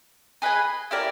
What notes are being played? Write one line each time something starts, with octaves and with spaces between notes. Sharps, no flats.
G#4 B4 D#5 G#5
E4 G4 A#4 D5